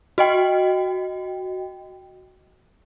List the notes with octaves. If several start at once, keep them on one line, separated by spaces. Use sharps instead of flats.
F#4 D#5 G5